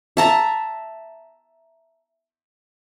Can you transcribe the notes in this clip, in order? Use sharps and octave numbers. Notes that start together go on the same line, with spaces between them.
E5 A5 A#5